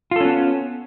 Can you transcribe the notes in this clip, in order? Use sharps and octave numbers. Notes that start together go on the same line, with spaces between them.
B3 C#4 F4 A4